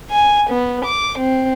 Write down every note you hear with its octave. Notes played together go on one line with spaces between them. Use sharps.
G#5
B3
D6
C4